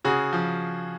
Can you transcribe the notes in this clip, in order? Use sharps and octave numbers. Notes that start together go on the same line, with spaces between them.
C#3 F#4 G#4
F3